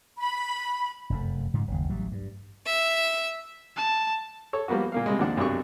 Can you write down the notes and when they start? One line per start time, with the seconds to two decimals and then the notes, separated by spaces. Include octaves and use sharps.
0.17 B5
1.10 F1 F#2 A3
1.54 G#2 C#3 F3
1.68 F#1 D#2
1.90 A1 F#3 G3
2.12 G2
2.66 E5
3.76 A5
4.53 A4 C#5
4.68 F3 G3 A#3 B3 F#4
4.92 A#2 A#3 F5
5.06 C3 G3 G#3
5.19 D#2 F3 D4 F#5
5.37 B1 F#2 C3 D4 C#6